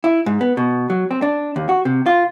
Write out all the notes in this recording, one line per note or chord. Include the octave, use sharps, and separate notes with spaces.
E4
G#2
B3
B2
F#3
C4
D4
D#2
F#4
C3
F4